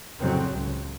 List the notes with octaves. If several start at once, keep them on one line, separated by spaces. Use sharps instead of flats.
F2 A2 C#3 F#3 C4
C#2